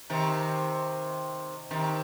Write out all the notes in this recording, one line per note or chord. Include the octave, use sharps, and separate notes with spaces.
C3 D#3
C3 D#3